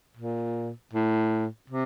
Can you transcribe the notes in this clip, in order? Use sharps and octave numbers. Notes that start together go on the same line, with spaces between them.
A#2
A2
C3